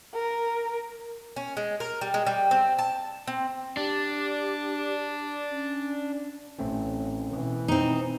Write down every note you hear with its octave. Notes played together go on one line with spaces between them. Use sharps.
A#4
C#4
G#3
A#4
G3
G#3
G3
C4
A5
C4
D4 G4
C#4
A1 A3 C4 C#4
B2 E3
C4 D#4